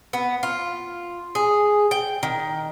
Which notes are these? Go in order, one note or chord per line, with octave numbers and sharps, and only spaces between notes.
B3
F4
G#4
G5
D#3